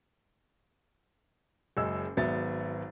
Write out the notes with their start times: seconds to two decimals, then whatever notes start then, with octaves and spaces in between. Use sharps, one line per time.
1.77 F#1 F#2 G#3 E6
2.17 G#1 F#3 B3 E5 A6